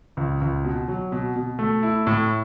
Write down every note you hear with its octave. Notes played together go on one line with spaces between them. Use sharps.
C#2
C#2
B2
F#3
B2
B2
A3
E4
A2